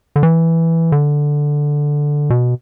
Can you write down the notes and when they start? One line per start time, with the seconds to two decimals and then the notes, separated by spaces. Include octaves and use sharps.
0.16 D3
0.23 E3
0.92 D3
2.30 B2